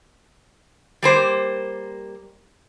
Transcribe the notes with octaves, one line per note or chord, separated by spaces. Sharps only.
G3 A#3 C5